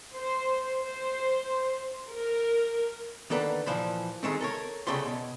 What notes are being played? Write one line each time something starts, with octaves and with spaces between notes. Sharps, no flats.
C5
C5
A#4
D3 D#3 A#3 A4 B4
A#2 E3 F3 C5 B5
D#3 G#3 A3 C4
A4 A#4 C#5
C2 C#3 A3 G4 C6
B2